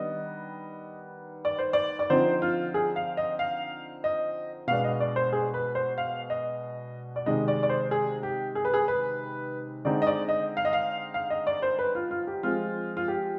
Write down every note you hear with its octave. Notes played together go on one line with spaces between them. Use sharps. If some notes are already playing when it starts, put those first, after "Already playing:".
Already playing: D#3 G3 B3 D4 D#5
D5
C5
D5
D5
D3 F3 C4 D#4 C5
F4
G#4
F5
D#5
F5
D#5
B2 G#3 B3 D4 F5
D#5
D5
C5
G#4
B4
C5
F5
D#5
D5
C3 D#3 G#3 D#5
D5
D5
C5
G#4
G4
G#4
B4
G#4
B4
D3 G#3 C4 D#4 D5
D#5
D5
D#5
F5
D#5
F5
F5
D#5
D5
C5
B4
F4
F4
G4
F3 G#3 C4 F4
F4
G4